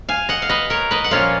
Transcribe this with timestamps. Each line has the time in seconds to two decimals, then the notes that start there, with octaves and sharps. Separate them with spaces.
0.09 F5 G#5
0.29 D#5 F#5
0.42 F5
0.49 B4 D#5
0.70 A#4 C#5
0.91 B4 D#5
1.04 F#5
1.11 A#2 F3 A#3 C#4 F4 C#5 F5